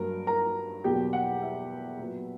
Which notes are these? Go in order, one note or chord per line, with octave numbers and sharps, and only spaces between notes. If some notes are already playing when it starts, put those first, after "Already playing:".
Already playing: G2 F#3 A#3 A#4
A#4 A#5
E2 B2 F#3 A#3 G4 G5
F#5
E5
A#2 F#3 B3